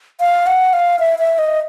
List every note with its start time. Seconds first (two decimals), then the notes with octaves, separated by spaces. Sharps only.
0.20 F5
0.47 F#5
0.73 F5
0.99 E5
1.19 E5
1.39 D#5